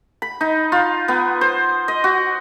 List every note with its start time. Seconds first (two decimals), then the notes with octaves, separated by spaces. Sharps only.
0.22 B5
0.41 D#4
0.72 F4
1.08 B3
1.41 C5
1.88 D#5
2.04 F#4